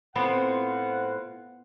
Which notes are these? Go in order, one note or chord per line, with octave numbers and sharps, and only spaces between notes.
A2 B3 C4 F4 F#5